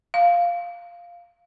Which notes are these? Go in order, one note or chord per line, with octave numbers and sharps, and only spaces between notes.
F5